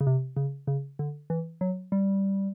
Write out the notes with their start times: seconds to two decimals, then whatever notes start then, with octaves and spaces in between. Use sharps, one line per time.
0.01 C#3
0.07 C3
0.37 C#3
0.67 C#3
0.99 D3
1.30 E3
1.61 F#3
1.92 G3